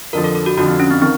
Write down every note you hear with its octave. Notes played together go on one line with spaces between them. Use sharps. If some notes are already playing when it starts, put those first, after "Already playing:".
F2 D3 F3 A#4
A4
A4
F#4
F2 D3 F3 F#4
C4
C#4
C4
D#3 C4